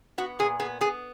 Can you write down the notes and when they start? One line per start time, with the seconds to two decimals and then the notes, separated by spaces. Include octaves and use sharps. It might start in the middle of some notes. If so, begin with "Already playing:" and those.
0.18 B3 F#4
0.39 A#2 G#4
0.60 B3 G#4
0.81 B3 G#4